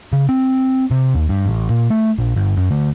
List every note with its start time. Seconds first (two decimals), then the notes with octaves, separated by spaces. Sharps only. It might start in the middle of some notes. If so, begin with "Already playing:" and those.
0.13 C#3
0.29 C4
0.91 C3
1.15 D#2
1.29 G2
1.46 A1
1.70 A#2
1.90 A3
2.19 A#1
2.36 G1
2.57 F#2
2.71 D2